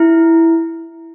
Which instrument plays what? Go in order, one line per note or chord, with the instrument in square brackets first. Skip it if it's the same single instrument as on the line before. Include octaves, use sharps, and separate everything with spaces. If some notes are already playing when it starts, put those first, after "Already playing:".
Already playing: [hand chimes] E4